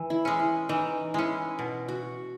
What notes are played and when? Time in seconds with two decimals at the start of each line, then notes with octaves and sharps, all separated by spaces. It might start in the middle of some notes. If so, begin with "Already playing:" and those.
Already playing: E3
0.10 E4
0.25 G#3 C#4
0.39 E4
0.69 E3 D#4
1.14 G#3 C#4 E4
1.59 B2
1.88 F#4